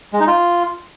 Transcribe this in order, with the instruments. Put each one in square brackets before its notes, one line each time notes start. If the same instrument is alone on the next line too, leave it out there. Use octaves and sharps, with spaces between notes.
[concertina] G#3
D#4
F4